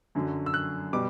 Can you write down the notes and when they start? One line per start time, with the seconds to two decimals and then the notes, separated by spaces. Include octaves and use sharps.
0.15 F#2 D3 F#3
0.46 E6
0.54 F#6
0.93 B2 G3 D6